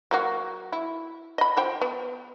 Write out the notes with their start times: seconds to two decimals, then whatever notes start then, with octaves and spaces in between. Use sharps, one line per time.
0.11 F#3 A#3 F#4
0.72 E4
1.38 D#5 B5
1.57 F3 C5 G5
1.81 B3